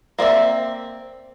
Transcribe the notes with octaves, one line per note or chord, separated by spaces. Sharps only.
A#3 C4 D5 E5